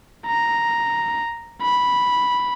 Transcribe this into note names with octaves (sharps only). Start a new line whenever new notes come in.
A#5
B5